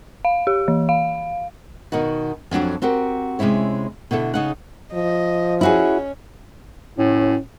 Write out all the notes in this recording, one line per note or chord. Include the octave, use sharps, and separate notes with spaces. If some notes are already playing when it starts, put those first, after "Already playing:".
F5
G4
E3
F5
B2 D#3 D#4 F#4
F2 F#3 D4 F#4
C4 F#4 G4 A#4
C3 G#3 C#4 E4 C#5
B2 D3 E4 A4
C#3 D#4 F#5
F3 D#5
C#4 E4 F#4 G#4
A2 C#4